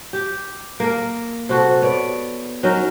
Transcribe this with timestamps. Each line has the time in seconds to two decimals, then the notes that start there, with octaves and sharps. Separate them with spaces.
0.13 G4
0.80 A#3 A#4
1.49 C3 F#4 A4
1.82 B3 C#5 D5
2.63 F#3 C#4 D#4 A#4